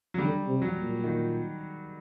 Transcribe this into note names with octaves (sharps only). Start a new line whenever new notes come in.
F#3
D3 G3
C3
F#3
A#2
D#3